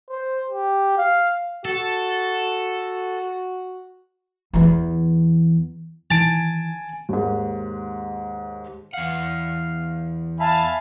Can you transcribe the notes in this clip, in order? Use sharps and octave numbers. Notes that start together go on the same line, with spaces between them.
C5
G4
F5
F#4 A4
E2 E3
D#3 E3 G#5 A5 D7
D#2 G#2
E2 F5 F#5
E5 F5 G#5 A5 B5